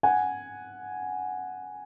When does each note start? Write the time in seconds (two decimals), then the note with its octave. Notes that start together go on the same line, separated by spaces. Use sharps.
0.03 F#5 G#5